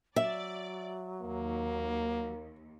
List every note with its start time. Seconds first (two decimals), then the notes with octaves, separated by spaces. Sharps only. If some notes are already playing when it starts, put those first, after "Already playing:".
0.16 F#3 D5 E5
1.22 D#2 A#3